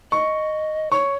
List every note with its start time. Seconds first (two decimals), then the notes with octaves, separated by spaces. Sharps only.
0.12 D#5 C#6
0.91 C#5 C#6